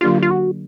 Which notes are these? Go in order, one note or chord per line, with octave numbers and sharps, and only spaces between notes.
D3 F#3 A#3 D4 F4 G4
F4
F#4